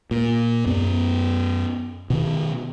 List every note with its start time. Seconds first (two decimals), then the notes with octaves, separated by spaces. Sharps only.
0.11 A#2
0.66 F#2 B3
2.10 B2 D#3